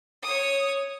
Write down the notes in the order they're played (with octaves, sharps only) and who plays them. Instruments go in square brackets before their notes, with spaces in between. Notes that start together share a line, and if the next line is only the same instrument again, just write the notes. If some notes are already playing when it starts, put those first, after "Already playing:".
[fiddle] C#5 D#6